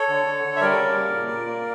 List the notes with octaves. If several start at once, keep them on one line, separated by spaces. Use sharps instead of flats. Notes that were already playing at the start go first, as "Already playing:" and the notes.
Already playing: A4 C#5
D3
D3
D3
E5
G3 A#4 D5
C#3
A#3
A#2
A#2
A#3